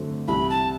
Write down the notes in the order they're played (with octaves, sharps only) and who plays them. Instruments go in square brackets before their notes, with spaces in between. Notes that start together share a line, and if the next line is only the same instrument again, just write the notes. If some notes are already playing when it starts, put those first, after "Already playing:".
Already playing: [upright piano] D3 F#3 A3 C4
[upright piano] C2 C3 E3 [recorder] B5
[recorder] A5